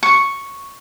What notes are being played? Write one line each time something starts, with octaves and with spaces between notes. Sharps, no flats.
C#6